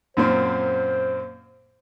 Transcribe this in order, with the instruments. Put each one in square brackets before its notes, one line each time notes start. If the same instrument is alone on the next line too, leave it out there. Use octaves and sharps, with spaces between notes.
[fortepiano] F#2 A#2 C4 [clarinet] C5